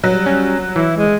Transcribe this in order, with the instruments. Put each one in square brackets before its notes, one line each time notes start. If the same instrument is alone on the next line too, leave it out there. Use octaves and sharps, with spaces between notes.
[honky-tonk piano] F#3 [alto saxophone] G3
[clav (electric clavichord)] C#4
[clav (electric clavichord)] E3 [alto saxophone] E4
[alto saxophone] G#3